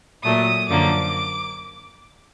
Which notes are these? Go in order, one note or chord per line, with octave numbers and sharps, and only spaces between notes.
A#2 F#3 A3 D#6
F#2 D3 F3 A#3 D6